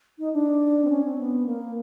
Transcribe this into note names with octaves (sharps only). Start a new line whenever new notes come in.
D#4
D4
C4
C#4
C4
B3
A#3